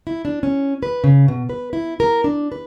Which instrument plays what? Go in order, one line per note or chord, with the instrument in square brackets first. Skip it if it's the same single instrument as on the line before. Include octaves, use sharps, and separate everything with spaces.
[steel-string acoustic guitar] E4
D4
C#4
B4
C#3
B2
B4
E4
A#4
D4
B4